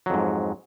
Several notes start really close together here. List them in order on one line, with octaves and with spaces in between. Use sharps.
F#3 F2 G#2